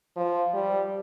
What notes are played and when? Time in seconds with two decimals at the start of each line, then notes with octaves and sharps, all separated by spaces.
0.16 F3
0.54 G3